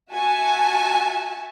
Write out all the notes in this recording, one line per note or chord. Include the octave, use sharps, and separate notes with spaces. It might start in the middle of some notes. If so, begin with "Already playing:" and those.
F#4 E5 G#5 A5